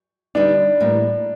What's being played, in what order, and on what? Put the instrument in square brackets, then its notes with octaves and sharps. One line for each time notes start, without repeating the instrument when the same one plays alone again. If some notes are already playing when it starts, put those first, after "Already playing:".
[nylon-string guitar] D3 G3 B3 D#4 [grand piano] D4
[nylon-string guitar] A2 E3 G3 A#3